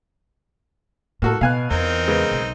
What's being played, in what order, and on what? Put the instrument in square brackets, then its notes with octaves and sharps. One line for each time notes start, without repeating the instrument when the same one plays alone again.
[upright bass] A2 [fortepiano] A#3 F#4 A4
[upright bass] B2 [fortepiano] F5 G#5 F#6
[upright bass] E2 [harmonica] C4 D#4 A#4
[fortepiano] C#3 G#3 B3
[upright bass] B1